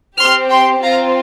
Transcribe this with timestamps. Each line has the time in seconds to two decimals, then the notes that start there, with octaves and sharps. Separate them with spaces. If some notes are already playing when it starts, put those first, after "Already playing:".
0.18 C4 G4 C6 F6
0.51 G5 C6
0.83 C4 F4 F5 A#5